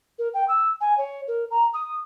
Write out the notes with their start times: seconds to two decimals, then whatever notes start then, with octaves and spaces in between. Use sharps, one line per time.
0.18 A#4
0.34 G5
0.48 E6
0.80 G#5
0.97 C#5
1.27 A#4
1.50 A#5
1.73 D#6